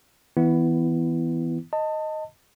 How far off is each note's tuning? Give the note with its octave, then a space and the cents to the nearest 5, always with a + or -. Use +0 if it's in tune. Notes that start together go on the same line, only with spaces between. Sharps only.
E3 -25 B3 +15 E4 +5
D#5 +0 A5 +25